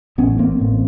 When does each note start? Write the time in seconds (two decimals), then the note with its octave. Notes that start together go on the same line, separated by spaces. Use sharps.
0.18 A1 A2 B3 C#4
0.39 A#3 C4
0.60 A1 A2